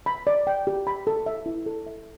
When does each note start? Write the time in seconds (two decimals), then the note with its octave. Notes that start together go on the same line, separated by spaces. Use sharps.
0.06 B5
0.27 D5
0.47 G5
0.67 G4
0.87 B5
1.07 A4
1.26 E5
1.46 E4
1.66 A4
1.87 E5